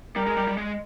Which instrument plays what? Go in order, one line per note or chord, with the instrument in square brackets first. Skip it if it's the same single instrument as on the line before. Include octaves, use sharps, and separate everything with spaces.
[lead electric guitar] G3 [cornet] A#4
[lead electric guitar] G#3
G3
G3
G#3